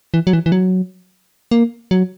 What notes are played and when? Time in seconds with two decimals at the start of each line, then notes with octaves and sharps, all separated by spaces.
0.14 E3
0.27 F#3
0.33 E3
0.46 E3
0.52 F#3
1.51 A#3
1.91 F#3